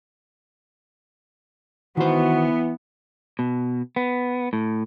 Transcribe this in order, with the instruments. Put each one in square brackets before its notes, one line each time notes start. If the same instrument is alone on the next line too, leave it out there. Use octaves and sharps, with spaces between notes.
[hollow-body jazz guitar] D#3 C5 [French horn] E3 [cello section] B3 [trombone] F#4
[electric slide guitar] B2
B3
A2